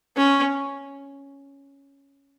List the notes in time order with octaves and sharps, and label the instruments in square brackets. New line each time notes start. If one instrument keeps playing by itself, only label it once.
[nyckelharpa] C#4